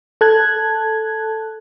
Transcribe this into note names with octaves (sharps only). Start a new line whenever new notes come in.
A4 A5 F#6 G#6